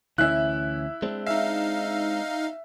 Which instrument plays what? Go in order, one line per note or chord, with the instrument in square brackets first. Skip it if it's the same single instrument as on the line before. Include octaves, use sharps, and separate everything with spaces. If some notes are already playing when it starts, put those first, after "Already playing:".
[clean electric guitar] D2 E3 C#4 [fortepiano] E4 [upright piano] E5 F#6
[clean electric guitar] G#3 C4 D4
[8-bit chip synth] D#4 F5 [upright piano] E5